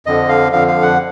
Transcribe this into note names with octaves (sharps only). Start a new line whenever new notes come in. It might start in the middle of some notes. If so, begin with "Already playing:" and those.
F2 D3 F3 D#5
F5
F2 D3 F3 F5
F5
F#5